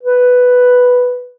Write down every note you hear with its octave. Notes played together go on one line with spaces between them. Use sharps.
B4